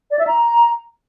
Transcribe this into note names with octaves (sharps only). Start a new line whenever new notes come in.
D5
E5
A#5